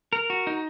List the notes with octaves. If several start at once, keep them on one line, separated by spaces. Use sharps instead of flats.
A#4
F#4
D#4